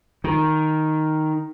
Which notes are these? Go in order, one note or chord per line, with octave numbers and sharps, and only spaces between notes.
D#3